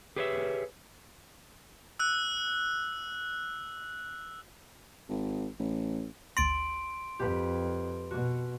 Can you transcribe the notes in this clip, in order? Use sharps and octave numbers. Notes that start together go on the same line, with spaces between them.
G4 G#4 B4 C#5 D#5 E5
E6 F#6
G#1
A1
G#1 D2 C6 A6 D7
F2 G4 B4
B2 F#4